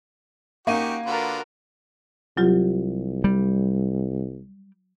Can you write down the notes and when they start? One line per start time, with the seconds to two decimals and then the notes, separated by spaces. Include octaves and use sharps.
0.67 A#3 C#4 D#4 F#4 G4 C#6 D#7
1.06 D3 F4 F#4 A#4 B4
2.37 C2 F#3 F4 G4
3.24 G3